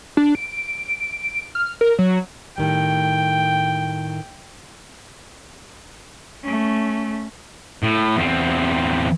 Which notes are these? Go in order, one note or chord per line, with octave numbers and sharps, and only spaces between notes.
D4
D7
F6
A#4
F#3
A2 D#3 G3 G5
A3 C#4
A2
E2 C4